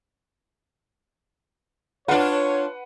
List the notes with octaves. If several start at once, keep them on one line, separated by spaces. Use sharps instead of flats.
D4 F4 B4 C#5 F#5